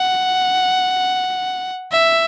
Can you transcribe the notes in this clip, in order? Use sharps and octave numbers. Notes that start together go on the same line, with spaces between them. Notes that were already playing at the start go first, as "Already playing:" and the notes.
Already playing: F#5
E5